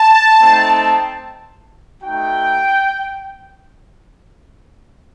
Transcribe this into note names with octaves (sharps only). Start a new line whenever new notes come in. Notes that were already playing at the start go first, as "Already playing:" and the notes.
Already playing: A5
A3 C4 D#4
A3 D#4 F#4 G5